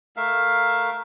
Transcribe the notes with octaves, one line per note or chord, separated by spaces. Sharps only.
A3 A#4 E5 F5